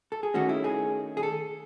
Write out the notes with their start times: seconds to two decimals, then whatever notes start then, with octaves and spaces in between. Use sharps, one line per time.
0.12 A4
0.23 G#4
0.34 D#3 A3 C#4 F#4
0.49 E4
0.64 G#4
1.17 G#4
1.23 A4